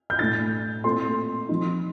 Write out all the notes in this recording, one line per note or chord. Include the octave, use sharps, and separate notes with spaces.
G6
A2 A3 D4 A6
A#2 A3 C4 F4 C6
F3 C4 D#4